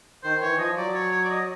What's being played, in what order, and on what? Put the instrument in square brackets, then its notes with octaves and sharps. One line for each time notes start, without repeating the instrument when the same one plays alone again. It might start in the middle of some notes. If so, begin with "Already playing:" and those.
[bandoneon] D#3 [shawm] C5
[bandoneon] E3 [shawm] C#5
[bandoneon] F3 [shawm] D#5
[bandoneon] F#3 [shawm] D5
[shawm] C#5
C#5
D5
D#5